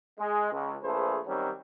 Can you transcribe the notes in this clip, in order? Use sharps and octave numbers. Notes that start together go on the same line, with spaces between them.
G#3
C#2
A#1 A3 G#4 B4 C5
D#3 F#3 G3 C4 C#4